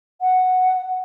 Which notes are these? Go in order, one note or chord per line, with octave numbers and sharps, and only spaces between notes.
F#5